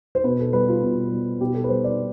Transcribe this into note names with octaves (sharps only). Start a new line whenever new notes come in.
C5
B2 B4
A4
G3 B4
F4
B2
G3
B2 G4
A4
B4
G3 C5
D5